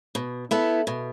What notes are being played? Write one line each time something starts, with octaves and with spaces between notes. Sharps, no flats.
B2
B3 E4 A4
B2